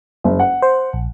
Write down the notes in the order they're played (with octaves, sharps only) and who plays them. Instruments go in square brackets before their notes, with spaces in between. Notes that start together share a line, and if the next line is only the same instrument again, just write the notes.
[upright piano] F#1
F#5
[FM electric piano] C5
A#1